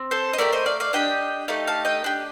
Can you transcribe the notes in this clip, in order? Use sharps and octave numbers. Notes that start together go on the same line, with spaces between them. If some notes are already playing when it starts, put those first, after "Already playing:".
Already playing: C4
A4 C5
D#5
A3 D#4 G4 A#4 D5
C5 D#5
D5 F5
D5 F5
D4 G4 D#5 G5
A3 D#4 G4 F5 A5
F5 A5
D#5 G5
D4 G4